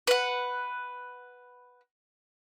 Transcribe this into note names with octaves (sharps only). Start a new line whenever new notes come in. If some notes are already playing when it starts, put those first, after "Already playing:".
B4 F#5